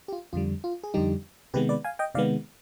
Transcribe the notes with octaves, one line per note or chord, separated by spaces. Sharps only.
G4
F4
F2 D3 G3 F4
F4
G#4
F2 D3 G3 D#4 G4
C3 D#3 G#3 B3 G4 B4
B4 D5
F5 G#5
D#5 G5
C3 D#3 G#3 B3 D5 F5